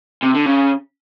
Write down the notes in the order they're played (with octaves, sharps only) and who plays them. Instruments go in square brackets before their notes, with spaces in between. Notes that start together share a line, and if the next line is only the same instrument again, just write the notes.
[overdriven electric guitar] C3
D3
C#3